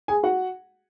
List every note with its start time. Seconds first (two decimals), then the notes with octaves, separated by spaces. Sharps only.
0.08 G#4 G#5
0.23 F#4 F#5